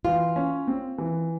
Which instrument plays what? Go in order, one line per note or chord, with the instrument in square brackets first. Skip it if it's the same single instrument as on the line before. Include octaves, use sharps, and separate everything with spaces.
[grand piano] E3 [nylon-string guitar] F4
[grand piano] C#4
C4
E3